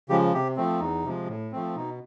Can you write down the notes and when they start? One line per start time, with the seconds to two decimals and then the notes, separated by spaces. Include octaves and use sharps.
0.09 C#3 F3 G#3 G4
0.33 C3 G4
0.57 F3 A3 C4
0.80 E2 D#4
1.04 C3 F3 G#3
1.28 A2
1.52 F3 A3 C4
1.76 B2 D#4